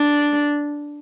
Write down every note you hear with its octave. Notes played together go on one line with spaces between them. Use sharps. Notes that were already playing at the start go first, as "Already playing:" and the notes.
Already playing: D4